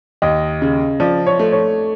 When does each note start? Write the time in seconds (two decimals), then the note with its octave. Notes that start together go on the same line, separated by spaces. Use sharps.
0.22 D#2 D#5
0.62 C#3
1.00 F3 D5
1.26 C#5
1.39 A3
1.52 C#5